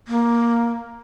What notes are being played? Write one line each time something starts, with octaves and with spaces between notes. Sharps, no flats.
A#3